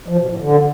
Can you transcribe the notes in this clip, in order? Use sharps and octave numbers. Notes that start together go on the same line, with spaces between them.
F3
B2
A2
D3